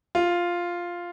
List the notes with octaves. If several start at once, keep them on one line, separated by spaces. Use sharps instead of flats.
F4